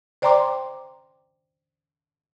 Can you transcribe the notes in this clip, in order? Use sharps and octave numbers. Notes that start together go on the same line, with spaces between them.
C5 D5 G5 A#5 C6 D6